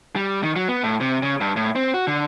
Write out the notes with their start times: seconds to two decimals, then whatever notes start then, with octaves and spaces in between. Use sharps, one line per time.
0.16 G3
0.43 D#3
0.56 F#3
0.69 B3
0.84 A2
1.01 C3
1.23 C#3
1.41 G2
1.57 A2
1.76 C4
1.94 F#4
2.07 D3